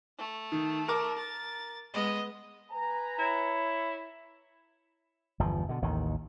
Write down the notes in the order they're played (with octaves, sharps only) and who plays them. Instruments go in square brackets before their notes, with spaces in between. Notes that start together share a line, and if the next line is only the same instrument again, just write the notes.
[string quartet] A3
[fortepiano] D#3
A#4 D6
[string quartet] A6
G#3 B3 D#5
[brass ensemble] B4 G#5 A#5
[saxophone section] E4 C#5
[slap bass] G1 E2 F3
B2 D3
A1 D#2 D#3